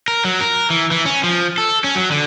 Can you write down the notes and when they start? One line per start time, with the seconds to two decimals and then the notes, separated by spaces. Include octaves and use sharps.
0.08 A#4
0.25 F#3
0.40 A#4
0.70 E3
0.91 E3
1.05 C#4
1.23 F3
1.58 A4
1.84 C#4
1.95 F#3
2.11 D3